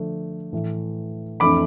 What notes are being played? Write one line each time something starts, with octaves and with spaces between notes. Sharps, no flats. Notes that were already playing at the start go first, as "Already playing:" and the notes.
Already playing: D3 F3 A3 D4
A2 E3 A3
F2 E3 A3 D4 B5 D6